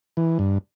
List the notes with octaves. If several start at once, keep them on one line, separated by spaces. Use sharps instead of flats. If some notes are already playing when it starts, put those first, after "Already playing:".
E3
G2